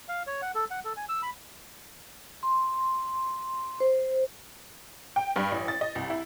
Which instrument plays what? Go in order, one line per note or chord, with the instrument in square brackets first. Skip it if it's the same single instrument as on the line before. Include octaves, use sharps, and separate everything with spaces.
[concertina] F5
C#5
F#5
A4
F#5
A4
G#5
E6
B5
[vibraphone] C6
C5
[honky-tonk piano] G5
G2
A1
A6
D#5
C2
E4